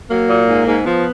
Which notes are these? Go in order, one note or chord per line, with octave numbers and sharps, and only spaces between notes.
F#3 A#3
A#2
G#2
G#2
F3 B3